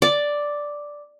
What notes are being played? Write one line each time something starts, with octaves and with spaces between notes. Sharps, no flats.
D5